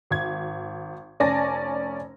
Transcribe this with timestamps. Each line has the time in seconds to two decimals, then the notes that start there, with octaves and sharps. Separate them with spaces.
0.11 G#1 G#6
1.20 F1 C#4 D5 G#5 A5 A#6